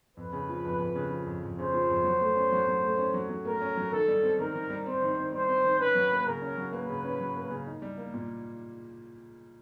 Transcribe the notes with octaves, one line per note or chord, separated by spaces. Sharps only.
F2 B4
C#3
F3
F2
F2
C#3
F3
F2
F2
C#3 C5
F3
F2
F#3
A3
C#4
F#3
F#3
A3
C#4
F#3
F#3
A3 A#4
C#4
F#3
D#3 A4
G3
C4
D#3 A#4
D#3
G3
C4 C5
D#3
D#3
G3 C5
C4
D#3
C#4 B4
F#3
A#3
C#3 A#4
C#4
F#3
A#3 B4
C#3
C#4
F#3
A#3
C#3
D#4
G3
A#3
A#2